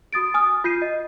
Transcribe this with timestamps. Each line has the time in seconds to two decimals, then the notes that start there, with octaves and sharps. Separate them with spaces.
0.13 F#4 D#6 A6 D7
0.34 G#5 D#6 F6
0.64 F4 G6 C7 D#7
0.82 D#5